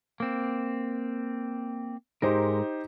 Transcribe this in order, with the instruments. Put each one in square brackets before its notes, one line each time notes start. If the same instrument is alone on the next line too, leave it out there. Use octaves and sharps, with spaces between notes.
[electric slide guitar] A#3 C4
[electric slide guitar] G#2 G#3 A#4 [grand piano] D#4 G4 C5